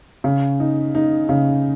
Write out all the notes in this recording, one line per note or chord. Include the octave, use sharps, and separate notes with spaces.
C#3
D#4
D#4
C#3